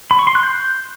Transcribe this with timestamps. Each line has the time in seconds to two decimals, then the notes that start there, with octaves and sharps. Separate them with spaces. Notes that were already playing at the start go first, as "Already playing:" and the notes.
0.11 B5
0.19 C#6
0.27 C6
0.35 F#6
0.43 G6